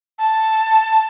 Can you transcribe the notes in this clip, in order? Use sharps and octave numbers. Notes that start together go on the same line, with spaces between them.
A5